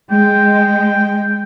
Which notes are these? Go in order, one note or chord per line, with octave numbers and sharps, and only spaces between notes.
G#3 G5